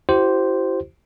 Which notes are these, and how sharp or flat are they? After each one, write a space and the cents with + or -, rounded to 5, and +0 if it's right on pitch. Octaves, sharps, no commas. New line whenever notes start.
E4 +20 G4 -40 C5 +0